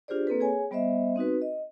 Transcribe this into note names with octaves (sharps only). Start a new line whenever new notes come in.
D4 F4 G4 G#4 C5 D5
A#3 C4 A4 B4
G#4 C#5 G#5
G3 B3 C5 D#5 E5
C4 D#4 F#4 B4
D#5